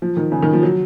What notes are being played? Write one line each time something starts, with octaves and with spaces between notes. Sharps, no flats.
F3
D#3
C#3
D#3
F3
F#3